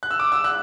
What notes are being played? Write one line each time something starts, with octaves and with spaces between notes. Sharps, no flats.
F#6
E6
D6
E6
F#6